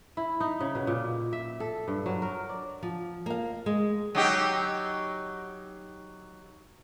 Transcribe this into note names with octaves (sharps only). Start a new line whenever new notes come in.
E4
D#4
C#3
B2
A#2
E5
A4
G2
F#3
A#4
D5
F3
A#3 F5
G#3
F#3 D#4 G4